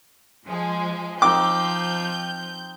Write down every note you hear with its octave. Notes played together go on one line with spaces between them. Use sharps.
F3 G#3
F3 C4 D#4 D6 G6